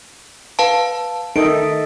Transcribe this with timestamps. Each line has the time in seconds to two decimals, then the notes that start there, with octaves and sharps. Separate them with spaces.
0.59 B4 F5 A5
1.36 D#3 A4 D#5 E5 D7